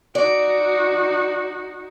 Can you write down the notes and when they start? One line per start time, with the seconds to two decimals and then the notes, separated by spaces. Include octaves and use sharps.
0.15 D#4 F#4 D5